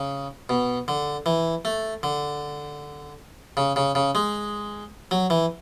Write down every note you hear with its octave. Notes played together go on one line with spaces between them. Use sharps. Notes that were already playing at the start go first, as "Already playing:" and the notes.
Already playing: C#3
B2
D3
E3
A3
D3
C#3
C#3
C#3
G#3
F#3
E3